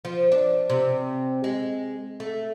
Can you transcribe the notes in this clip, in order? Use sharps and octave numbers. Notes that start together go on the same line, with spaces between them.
F3
D4
C3
G#3
A3